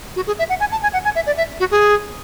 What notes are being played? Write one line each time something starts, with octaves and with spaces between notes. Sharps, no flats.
F#4
G#4
E5
F#5
G#5
A5
G#5
F#5
G#5
E5
D5
E5
F#4
G#4